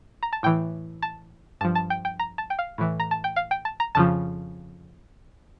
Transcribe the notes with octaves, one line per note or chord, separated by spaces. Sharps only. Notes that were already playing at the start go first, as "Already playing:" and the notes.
A#5
A5
A2 E3 G5
A5
G2 F3 A5
A5
G5
G5
A#5
A5
G5
F5
A2 E3
A#5
A5
G5
F5
G5
A5
A#5
F2 C#3 F3 A5